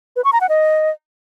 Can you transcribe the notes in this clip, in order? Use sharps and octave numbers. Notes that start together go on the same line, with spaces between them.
B4
C#6
A#5
F#5
D#5